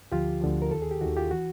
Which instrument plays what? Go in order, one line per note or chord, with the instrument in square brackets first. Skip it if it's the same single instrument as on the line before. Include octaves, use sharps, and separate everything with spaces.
[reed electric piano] D2 D3 F3 F4 G4
D2 D3 F3
A#4
D#2 D#3 A4
G#4
G4
D#2 D#3 F#4
F4 G4
E3 F#4